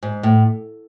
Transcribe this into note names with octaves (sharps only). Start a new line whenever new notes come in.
G#2
A2